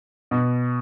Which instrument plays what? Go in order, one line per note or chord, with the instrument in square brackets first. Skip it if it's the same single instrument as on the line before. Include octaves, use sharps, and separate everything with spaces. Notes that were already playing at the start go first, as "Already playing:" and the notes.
[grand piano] B2